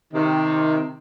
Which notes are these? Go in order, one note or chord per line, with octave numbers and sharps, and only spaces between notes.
C3 D#3